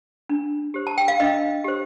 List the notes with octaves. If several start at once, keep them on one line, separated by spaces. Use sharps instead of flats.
D4
G4 C5
A5
G5
F5
D4 D#5
G4 C5